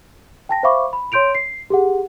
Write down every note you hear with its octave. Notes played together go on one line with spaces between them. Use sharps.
G5 A5 A#6
C5 E5 F5 B5 C#6 D6
B5
C#5 C6 G6 D7 F7
C7
G4 G#4 F#5